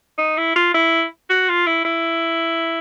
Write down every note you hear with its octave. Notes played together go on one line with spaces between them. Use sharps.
D#4
E4
F4
E4
F#4
F4
E4
E4